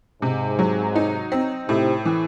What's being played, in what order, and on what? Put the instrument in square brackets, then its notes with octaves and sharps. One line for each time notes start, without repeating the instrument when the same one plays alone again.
[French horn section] G#2 [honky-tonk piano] C3
[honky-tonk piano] F#3
D#4
C4
[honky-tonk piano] A2 [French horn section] C3
[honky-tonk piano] E3